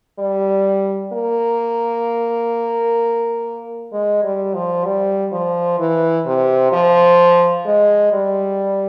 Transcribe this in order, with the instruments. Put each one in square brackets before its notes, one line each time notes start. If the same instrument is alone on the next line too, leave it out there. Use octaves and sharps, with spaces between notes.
[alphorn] G3
A#3
G#3
G3
F3
G3
F3
E3
C3
F3
G#3
G3